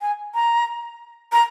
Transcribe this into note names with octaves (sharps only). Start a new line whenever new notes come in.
G#5
A#5
A#5